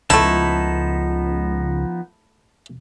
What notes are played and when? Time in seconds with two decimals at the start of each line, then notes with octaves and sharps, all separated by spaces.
0.10 C#2 F3 A3 B3 D#4 E4 A5